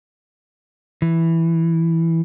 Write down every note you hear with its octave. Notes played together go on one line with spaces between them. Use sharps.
E3